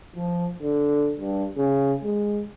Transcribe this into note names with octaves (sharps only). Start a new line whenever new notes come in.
F3
D3
G2
C#3
G#3